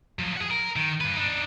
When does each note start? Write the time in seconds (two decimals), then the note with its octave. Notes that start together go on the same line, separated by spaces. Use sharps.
0.19 F3 F#3
0.37 G#4 F#5
0.51 A#4
0.76 D#3
1.01 G2 B4
1.16 D4 D#4